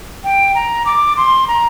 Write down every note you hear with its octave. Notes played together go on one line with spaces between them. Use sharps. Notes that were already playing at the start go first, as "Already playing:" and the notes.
G5
A#5
D6
C6
A#5